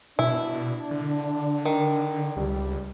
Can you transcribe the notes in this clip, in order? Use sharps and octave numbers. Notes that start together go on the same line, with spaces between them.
B2 D4 E4
D3
D#3
C#2 G3